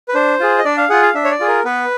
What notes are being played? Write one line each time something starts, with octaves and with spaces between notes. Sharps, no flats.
B4
D4 C5
F4 G#4
D#5
D4 D5
F5
F4 G#4 F#5
F5
D4 E5
C#5
D5
F4 G#4
A#4
B3 B4